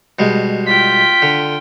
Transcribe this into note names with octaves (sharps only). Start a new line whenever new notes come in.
B2 G3 G#3
F4 G5 B6
D3